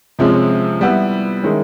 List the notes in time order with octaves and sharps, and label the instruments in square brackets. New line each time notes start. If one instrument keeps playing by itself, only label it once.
[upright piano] C3 F3 G#3 C#4
G3 B3 E4
D#3 G#3 C#4 E4